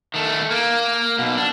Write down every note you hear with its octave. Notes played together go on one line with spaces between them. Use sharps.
D#3 A3
A#3
B1 B2
D4